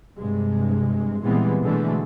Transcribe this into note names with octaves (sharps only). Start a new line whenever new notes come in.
G2 C3 G#3
A#2 E3 G3 G#3 B3 C4
B2 D3 E3 G#3 A3